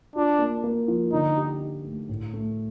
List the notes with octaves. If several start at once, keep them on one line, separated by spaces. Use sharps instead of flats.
D4 F4
A#3
A#3
F3
D3 D#4
G4
D#4
A3
A2
A3